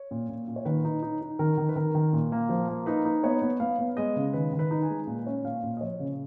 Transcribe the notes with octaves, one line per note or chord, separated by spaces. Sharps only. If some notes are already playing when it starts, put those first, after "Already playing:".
Already playing: C#5
A#2
A#2
A#2
C#5
D#3 B4
D#4
D#4
D#4
D#3 A#4
D#3
B4
D#3 A#4
D#3
A#2
A#3
F3
A#3
D#4 B4
D#4
B3 C#5
B3
B3 F5
B3
G#3 D#5
C#3
D#3 B4
D#3
B4
D#4
G#5
G#3
A#2
C#4
A#2 F5
A#2
D#5
F3 C#5
C#3